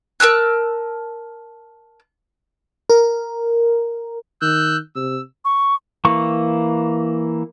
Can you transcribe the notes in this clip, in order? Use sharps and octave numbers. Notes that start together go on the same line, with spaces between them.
A#4 A5 E6 F#6
A#4
D#3 E6 F#6 G6
C3 E6
C#6
E3 A#3 C#6